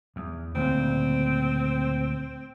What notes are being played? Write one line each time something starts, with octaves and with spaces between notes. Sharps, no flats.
E2
D2 A#2 C#3 C4